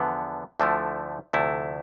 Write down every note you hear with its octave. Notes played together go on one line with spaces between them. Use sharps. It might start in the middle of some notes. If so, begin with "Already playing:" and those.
Already playing: E2 D3 F3 B3
D2 D3 F3 A3 E4
D2 C3 F3 A3 E4